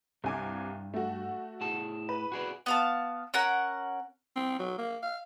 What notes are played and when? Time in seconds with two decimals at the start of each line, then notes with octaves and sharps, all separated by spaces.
0.24 C2 G2 G#5 D6
0.94 A3 F#4
1.61 A2 G#4 A5
2.09 B4
2.32 F#4 G#4 D5
2.66 B3 F5 A5
3.34 C#4 A#4 F#5
4.36 C4
4.59 F#3
4.78 A#3
5.03 F5